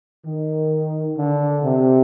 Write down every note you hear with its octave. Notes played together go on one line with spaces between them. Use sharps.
D#3
D3
C3